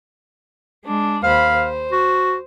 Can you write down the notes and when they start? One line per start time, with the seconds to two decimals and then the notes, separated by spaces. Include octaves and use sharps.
0.84 G#3 D4
1.23 D#2 C5 F5 B5
1.55 C5
1.92 F#4